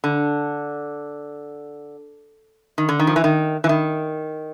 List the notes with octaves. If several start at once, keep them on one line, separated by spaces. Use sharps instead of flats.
D3
D#3
D3
D#3
F3
E3
D#3
E3
D#3